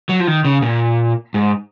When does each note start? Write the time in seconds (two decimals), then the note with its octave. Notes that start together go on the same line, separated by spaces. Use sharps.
0.09 F#3
0.20 F3
0.27 D#3
0.45 C#3
0.62 A#2
1.34 G#2